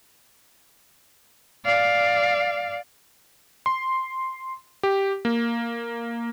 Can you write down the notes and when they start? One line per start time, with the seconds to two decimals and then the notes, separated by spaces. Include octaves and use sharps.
1.65 D5 F5
3.66 C6
4.83 G4
5.25 A#3